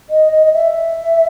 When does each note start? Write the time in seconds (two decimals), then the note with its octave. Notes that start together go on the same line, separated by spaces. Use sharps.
0.09 D#5
0.32 D#5
0.46 D#5
0.53 E5